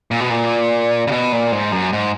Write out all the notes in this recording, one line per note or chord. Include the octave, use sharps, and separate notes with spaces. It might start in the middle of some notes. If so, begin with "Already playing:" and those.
A#2
B2
A#2
C#3
B2
A#2
G#2
F#2
G#2